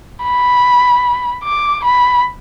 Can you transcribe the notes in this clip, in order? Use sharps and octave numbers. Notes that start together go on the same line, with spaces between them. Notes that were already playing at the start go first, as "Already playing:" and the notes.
B5
D6
B5